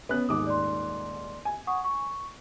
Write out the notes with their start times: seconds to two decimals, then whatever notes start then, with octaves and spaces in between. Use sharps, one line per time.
0.09 B3 C#4 F#6
0.29 D#1 G#2 D6 D#6
0.47 D5 C6
1.45 G#5
1.67 F#5 C#6 D#6
1.84 C#6